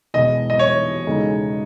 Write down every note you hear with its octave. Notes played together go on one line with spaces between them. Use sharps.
E1 E2 B2 G#3 D#5
D#5
C#5
E2 C#3 G#3 D#4 A4